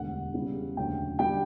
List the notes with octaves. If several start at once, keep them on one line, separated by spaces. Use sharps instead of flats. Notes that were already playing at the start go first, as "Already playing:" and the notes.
Already playing: E1 D2 D3 G3 F#5
E2 C#3 G3
E1 D2 C#3 F#3 G5
D3 G3 G5